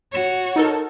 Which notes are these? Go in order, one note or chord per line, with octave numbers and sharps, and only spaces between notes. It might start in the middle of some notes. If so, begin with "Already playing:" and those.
F#4 C#5
D#4 A4 A#4